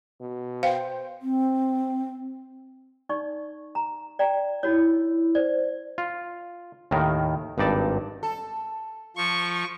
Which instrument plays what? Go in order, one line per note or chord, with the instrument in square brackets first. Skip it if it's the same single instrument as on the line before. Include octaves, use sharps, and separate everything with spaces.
[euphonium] B2
[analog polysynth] C5 G5 [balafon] F5
[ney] C4
[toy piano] D#4 D5 C#6
A#5
D5 G5 A#5
[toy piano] D#4 F#4 C#5 [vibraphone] E4
[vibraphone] C5 [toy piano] D5
[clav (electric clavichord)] F4
D#2 A2 D#3 A#4
G#1 G2 D#4 D5 A5
[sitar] A4
[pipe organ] F3 [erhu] C#6